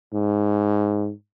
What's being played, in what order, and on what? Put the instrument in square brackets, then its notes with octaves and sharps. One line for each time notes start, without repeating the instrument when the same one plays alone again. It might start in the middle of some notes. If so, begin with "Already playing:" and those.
[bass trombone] G#2